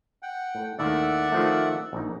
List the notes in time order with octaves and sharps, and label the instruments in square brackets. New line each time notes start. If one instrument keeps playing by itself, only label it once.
[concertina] F#5 G5
[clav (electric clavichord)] A2
[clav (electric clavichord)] D#2 A2 D#3 [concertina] D5 E5 F#5
[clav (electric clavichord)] D#3 F3 A3
A#1 D#4